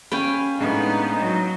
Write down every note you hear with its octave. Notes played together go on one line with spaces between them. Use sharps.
C#4 F5 G5 B5 G6
A2 G#3 B3 D4 D#4
F#3